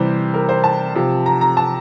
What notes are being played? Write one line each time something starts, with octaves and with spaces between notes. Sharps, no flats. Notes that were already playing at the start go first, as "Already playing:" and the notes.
Already playing: C3 E3 G3 C5
A#4
C5
A5
C3 F3
A#5
A#5
A5